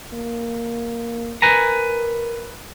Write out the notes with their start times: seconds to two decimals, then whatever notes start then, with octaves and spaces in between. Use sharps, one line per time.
0.13 A#3
1.42 A#4 B4 G#5 A#5